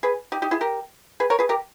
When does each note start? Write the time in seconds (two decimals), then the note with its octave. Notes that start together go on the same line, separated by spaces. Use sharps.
0.03 G#4 B4
0.32 D#4 G4
0.42 D#4 G4
0.51 E4 G#4
0.61 G4 A#4
1.20 G#4 B4
1.30 A#4 C#5
1.39 G#4 B4
1.49 G4 A#4